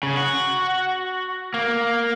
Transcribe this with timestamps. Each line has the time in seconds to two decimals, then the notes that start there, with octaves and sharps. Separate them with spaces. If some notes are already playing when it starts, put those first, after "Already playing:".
0.03 C#3
0.17 F#4
1.54 A#3